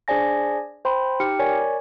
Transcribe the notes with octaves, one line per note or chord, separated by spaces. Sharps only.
D4 G#4 C5 D5 G#5 A#6
C5 G5 B5 C6
D#4 G4 G5 F6 C#7
A#4 C#5 D5 G#5